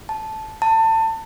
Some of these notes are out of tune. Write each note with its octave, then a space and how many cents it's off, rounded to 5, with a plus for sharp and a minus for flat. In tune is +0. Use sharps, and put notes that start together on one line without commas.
A5 -10
A5 +25